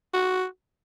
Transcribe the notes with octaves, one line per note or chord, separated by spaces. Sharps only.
F#4